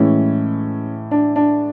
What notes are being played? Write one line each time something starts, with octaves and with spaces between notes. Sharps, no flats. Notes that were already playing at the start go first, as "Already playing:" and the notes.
Already playing: A2 E3 G#3 C#4 E4
D4
D4